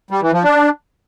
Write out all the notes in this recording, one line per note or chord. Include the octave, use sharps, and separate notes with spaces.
G3
E3
F3
D4